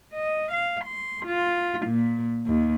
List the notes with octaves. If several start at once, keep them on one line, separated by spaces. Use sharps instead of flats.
D#5
F5
C6
F4
A#2
D#2